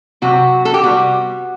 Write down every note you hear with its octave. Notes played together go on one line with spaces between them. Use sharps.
C3 F#3 C4 F#4
A4
G4
C3 G3 B3 F#4